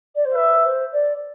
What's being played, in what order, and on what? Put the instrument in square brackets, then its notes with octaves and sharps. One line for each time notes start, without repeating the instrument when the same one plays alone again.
[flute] D5
C5
[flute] B4 [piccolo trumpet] E5
[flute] C5
D5